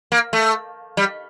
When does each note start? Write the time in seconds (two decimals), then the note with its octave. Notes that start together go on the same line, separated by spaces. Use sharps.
0.12 A#3
0.33 A3
0.97 G3